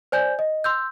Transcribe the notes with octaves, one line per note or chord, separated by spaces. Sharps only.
C5 D5 G#5 G6
D#5
C6 E6 G6